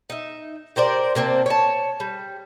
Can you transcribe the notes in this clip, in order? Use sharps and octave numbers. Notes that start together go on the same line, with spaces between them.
D#4 E5
G4 A#4 C5 D5
C3 A#3 C4 D4
C#5 A5
G3